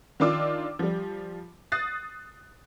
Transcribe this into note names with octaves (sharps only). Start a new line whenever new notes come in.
D#3 D4 F4 D6 E6
F3 G3
D#6 F#6 A6 C7